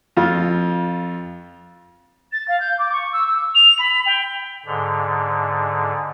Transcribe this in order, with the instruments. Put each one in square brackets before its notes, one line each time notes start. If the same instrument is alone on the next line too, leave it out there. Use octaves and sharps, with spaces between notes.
[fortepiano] F2 F4
[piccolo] A6
F5
G6
D6
C#6
E6
E6
F7
B5
G5
[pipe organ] G#2 D3